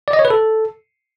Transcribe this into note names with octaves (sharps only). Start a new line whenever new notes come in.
D5
D#5
C#5
B4
A4